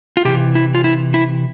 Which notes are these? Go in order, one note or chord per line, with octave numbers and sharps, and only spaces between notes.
F4
C3 E3 G4
E4
F4
E4
E4